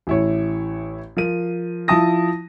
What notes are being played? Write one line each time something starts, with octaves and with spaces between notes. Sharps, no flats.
A1 E4 C#5
F3 A#4 D#7
F3 E4 A5 D#6 A#6